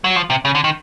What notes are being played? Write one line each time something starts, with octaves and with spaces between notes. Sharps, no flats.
F#3
F3
C3
C#3
D3
D#3